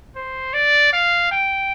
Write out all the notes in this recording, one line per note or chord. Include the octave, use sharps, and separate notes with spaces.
C5
D5
F5
G5